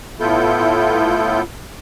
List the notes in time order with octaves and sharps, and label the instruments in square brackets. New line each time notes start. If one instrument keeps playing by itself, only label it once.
[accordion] A2 B3 E4 F4 A4 G6